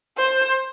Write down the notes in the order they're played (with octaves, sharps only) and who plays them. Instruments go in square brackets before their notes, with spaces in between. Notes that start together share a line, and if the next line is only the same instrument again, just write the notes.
[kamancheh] C5